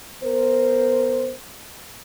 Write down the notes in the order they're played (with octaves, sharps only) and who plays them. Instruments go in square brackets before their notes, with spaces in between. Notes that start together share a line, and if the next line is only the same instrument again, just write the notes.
[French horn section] B3 A#4 C5